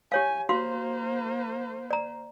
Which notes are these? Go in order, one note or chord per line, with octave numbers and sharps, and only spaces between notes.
G4 C#5 F5 G#5
A#3 F#4 C5 F5 C6
D5 A#5